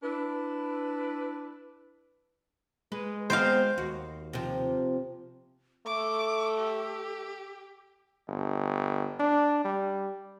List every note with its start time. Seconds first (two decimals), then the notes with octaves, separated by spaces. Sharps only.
0.03 D4 E4 B4
2.92 G#3 B4
3.30 B3 C4 D#4 C5 F5
3.78 D#2 F#4
4.33 C3 F3
5.87 A3 A4 D6
6.58 G4
8.28 G1
9.20 D4
9.65 G3